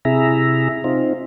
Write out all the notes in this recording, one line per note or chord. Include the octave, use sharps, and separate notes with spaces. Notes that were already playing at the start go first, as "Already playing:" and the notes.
C3 E4 G#4 E5 A#5
C4 D#4 F4